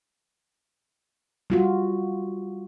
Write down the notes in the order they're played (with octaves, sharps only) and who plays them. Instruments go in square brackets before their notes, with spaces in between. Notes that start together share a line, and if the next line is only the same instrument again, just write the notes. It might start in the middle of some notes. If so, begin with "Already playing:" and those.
[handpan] G3 F4 F#4